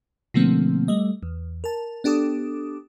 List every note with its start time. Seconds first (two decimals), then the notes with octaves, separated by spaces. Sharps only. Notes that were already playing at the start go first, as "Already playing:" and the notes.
0.34 B2 D3 F3 A3 A#3 C4
0.88 G3 A3 D#5
1.23 E2
1.64 A#4 A5
2.04 B3 D4 G4 A4 D6 D#6